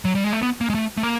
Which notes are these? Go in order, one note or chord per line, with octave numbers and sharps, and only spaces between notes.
F#3
G3
G#3
A3
B3
A#3
G#3
A3
A3
A#3